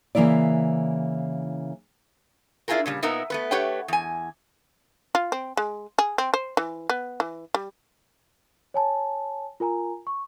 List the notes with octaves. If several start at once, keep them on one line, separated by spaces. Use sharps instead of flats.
C#3 E3 A#3 E4 D5
D4 E4 F4 G4 G#4 A#4
A#2 C#3 G3
A#2 B3 D#4 A#4 E5 A#5
A3 B3 B4
A3 G4 B4 C#5 F#5 G5
E2 G#5
F4
C4
G#3
G#4
C4
C5
E3
B3
E3
G3
C#5 G#5 A5
F4 A#4 G#5 A#5
C#6